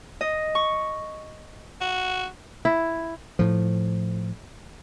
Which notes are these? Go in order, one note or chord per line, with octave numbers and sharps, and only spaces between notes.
D#5
C#6
F#4
E4
A2 F3